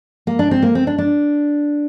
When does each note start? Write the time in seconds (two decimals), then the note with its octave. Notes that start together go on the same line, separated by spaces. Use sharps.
0.27 A#3
0.39 D4
0.51 C4
0.62 A#3
0.75 C4
0.87 D4
0.98 D4